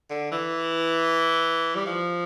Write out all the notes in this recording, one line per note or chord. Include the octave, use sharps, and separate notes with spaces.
D3
E3
G3
F3